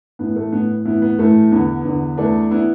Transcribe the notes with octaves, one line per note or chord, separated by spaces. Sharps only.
A2 E3 B3
A3
A2 E3 B3
A2 E3 B3 E4
B3
A2 E3 A3
E2 D3 B3
E2 D3
E2 E3 A3 D4
E3 B3 E4